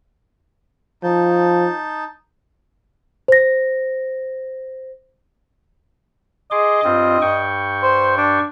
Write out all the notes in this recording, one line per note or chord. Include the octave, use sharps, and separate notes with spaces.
F3 D#4 A5 G6
C5 A#6
G#4 D#5 C6 D6
G2 C4 F4
G2 G5 C#6
C5
D4